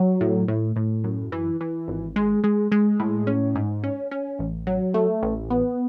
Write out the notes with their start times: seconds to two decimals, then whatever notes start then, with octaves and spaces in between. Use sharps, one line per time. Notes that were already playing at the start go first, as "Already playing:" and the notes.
Already playing: F#3
0.21 A2
0.48 A2
0.76 A2
1.04 F#2
1.32 E3
1.61 E3
1.88 G#1
2.16 G#3
2.44 G#3
2.72 G#3
3.00 A2
3.27 C#4
3.55 G#2
3.84 C#4
4.11 C#4
4.39 A1
4.67 F#3
4.94 A3
5.23 A1
5.50 B3